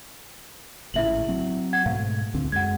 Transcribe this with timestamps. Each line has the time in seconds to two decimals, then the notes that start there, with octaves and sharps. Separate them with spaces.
0.94 G#1 A2 C#3 E4 E5 F#7
1.28 F#3 C4
1.73 F#5 G#6
1.86 G#2 B2 A3 F5
2.34 C#2 D3 C4
2.52 F#2 G#3 F#5 G#6